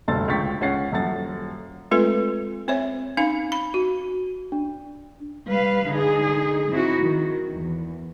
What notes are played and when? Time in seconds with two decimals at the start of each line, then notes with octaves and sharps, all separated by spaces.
0.08 F1 D2 G2 A4 C6 A6
0.28 C#2 D3 G5 C#6 A6 B6
0.61 C#2 C#4 C#5 F#5 A6 C7
0.92 D#1 F#2 A4 F#5 A6
1.91 G#3 A3 C4 F4 A4 B4
2.68 C4 C5 C#5 E5
3.17 C#4 D#4 F5 B5
3.52 B5
3.74 F#4
4.52 D4
5.49 G3 B4 F5
5.88 D3 D#4 G#4
6.71 C4 D#4 E4 F#4
7.03 D#3
7.52 E2